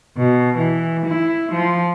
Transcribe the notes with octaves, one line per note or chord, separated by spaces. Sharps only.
B2
E3
E4
F3